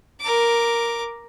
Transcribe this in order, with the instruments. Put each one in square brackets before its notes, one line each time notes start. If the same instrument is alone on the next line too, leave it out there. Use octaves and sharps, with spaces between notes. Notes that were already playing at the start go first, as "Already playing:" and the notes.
[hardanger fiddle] A#4 D6